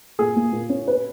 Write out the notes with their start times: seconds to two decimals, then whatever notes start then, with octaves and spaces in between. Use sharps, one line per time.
0.19 A#2 G#4
0.36 A#3
0.52 A#2
0.69 C#4
0.88 B4